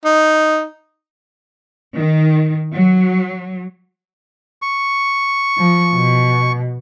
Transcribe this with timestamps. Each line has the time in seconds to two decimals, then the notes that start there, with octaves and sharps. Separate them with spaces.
0.05 D#4
1.97 D#3
2.74 F#3
4.62 C#6
5.57 F3
5.94 B2